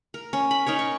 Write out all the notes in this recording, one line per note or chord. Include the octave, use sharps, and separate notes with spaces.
A#4
C#4
B5
C#4 D#4 A#4 C#5
C#6